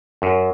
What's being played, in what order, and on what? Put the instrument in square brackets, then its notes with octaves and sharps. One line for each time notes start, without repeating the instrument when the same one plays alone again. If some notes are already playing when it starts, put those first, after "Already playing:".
[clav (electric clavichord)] F#2